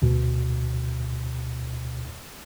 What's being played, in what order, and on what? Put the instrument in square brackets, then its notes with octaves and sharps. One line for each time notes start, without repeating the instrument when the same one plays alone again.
[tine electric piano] D2 B2